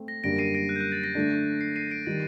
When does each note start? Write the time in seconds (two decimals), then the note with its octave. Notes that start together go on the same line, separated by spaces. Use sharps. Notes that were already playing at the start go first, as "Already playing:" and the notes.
Already playing: A3 C4
0.08 A#6
0.24 F#2 D3 G3 A#3 A#6 D7
0.39 C7 D#7
0.54 A#6 D7
0.69 F#6
0.76 G6
0.81 F#6
0.92 A6
1.04 A#6
1.15 D3 A3 D4
1.61 C7
1.76 C7 D#7
1.91 A#6 D7
2.06 D#3 G3 A6